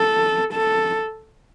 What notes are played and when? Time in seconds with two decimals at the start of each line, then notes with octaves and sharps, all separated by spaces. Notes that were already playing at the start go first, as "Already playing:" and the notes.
Already playing: A4
0.53 A4